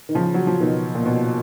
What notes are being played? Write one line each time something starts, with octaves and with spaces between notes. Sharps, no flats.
D#3
C#3 F3
F#3
F3
B2 D#3
A#2
B2